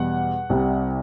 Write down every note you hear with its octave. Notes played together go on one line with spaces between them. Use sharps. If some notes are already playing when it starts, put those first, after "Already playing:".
Already playing: E2 B2 G3 F#5
C2 C3 G3